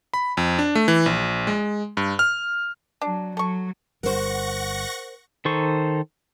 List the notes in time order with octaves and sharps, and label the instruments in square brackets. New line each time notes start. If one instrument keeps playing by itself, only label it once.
[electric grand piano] B5
F2
D4
A3
E3
A#1
G#3
G2
F6
[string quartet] F#3 [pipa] D4
[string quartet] F#3 [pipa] A4 C#6
[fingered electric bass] G1 G3 [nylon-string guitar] A#4 C5 [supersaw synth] F#5 C#6 A#6
[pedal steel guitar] D#3 D#4 A4 C5 C#6